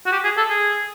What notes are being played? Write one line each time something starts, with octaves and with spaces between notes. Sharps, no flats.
F#4
G4
G#4
A4
G#4